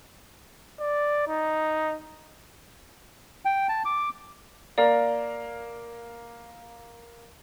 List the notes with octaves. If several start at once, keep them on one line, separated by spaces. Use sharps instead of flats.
D5
D#4
G5
A5
D6
A#3 A#4 D5 F5